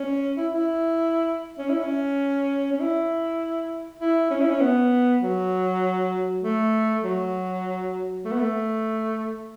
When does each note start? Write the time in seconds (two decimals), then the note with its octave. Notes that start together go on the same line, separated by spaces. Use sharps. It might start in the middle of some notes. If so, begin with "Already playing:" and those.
Already playing: C#4
0.37 E4
0.54 E4
1.59 C#4
1.70 E4
1.80 C#4
2.72 C#4
2.80 E4
4.01 E4
4.30 C#4
4.41 E4
4.50 C#4
4.61 B3
5.22 F#3
6.43 A3
7.03 F#3
8.25 A3
8.32 B3
8.39 A3